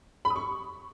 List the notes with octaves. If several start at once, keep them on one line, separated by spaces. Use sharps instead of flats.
B5
D#6
C#6